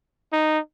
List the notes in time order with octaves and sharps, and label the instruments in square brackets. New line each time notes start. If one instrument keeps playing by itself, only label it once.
[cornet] D#4